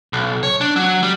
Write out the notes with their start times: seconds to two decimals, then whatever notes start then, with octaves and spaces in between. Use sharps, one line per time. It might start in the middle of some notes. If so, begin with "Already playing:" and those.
0.13 B1
0.43 C#5
0.61 D4
0.76 F#3
1.03 G3